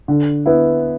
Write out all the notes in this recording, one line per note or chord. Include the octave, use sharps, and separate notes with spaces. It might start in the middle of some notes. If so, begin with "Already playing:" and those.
D3
B3 E4